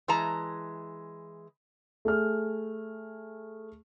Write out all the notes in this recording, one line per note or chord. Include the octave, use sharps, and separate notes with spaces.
E3 G#3 A5 A#5
A3 G#4 F6